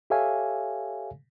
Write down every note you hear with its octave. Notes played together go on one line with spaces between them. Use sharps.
G4 A4 C#5 E5 F5 G#5